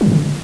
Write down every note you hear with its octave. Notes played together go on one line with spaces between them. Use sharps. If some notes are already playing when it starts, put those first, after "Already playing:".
F#3
A2
D3